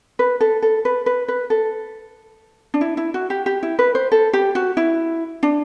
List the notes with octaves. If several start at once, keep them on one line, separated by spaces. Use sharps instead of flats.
B4
A4
A4
B4
B4
B4
A4
D4
E4
E4
F#4
G4
G4
E4
B4
C5
A4
G4
F#4
E4
D4